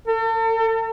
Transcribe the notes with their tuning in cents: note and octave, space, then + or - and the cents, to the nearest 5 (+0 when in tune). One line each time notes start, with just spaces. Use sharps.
A4 +40